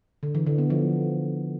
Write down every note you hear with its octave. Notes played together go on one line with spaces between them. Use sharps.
D3
E3
D3
B3
F3